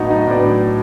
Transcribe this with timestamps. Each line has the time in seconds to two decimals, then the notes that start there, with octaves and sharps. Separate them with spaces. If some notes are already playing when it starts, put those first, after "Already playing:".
Already playing: A2 F#3 B3 D4 D#4 F#4
0.10 D#4
0.27 A2 F#3 B3 D4